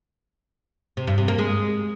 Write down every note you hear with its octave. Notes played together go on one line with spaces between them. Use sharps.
C3
G2
C3
A#3
G#3